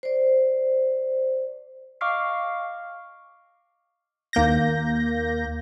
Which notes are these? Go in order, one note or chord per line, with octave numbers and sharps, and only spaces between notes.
C5 D5
D#5 F5 C#6 D6 F6 C7
D#2 A#3 G6 A#6